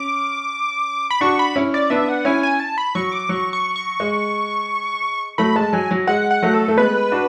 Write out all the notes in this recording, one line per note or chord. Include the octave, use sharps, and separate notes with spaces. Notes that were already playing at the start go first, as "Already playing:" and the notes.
Already playing: C#4 D6
B5
D4 F#4 C#6
B5
C#4 E4
D5
B3 D4 E5
F#5
C#4 E4 G#5
G#5
A5
B5
F#3 C#6
D6
F#3 C#6
C#6
C#6
G#3
F#3 A3 B5
G#3 A5
F#3 G#5
F#3
G#3 F#5
F#5
F#3 A3
A4
A3
G#3 B3 B4
D4 F#4